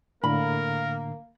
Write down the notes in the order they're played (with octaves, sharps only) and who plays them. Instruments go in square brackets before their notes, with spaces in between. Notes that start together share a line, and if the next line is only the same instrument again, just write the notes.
[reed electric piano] A2 D3 [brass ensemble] A#3 [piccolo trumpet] A#4 [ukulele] B5